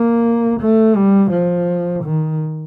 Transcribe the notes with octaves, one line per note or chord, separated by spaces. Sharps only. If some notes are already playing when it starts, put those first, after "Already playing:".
Already playing: A#3
A3
G3
F3
D#3